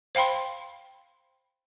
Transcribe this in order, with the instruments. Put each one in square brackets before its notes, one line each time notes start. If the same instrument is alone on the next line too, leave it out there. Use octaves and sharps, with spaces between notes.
[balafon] C5 F5 G5 B5 C6